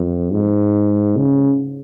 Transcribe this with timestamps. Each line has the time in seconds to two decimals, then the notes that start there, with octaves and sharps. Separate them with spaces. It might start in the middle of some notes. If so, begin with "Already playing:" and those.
Already playing: F2
0.33 G#2
1.17 C#3